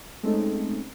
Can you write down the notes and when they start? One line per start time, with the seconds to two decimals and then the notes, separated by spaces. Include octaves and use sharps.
0.23 G#3 A3 C4 C#4 D#4 A4